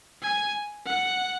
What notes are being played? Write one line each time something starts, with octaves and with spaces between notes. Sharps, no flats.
G#5
F#5